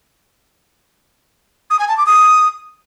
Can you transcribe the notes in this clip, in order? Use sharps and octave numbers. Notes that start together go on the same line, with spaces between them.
D#6
G#5
A5
D6
D#6